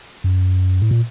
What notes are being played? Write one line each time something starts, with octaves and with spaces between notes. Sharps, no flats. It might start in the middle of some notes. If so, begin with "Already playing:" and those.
F#2
A2
A#2